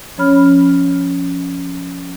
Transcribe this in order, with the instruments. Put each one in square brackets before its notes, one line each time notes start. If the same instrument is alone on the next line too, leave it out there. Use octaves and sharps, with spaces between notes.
[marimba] F3 C#4 C#5 B5 F6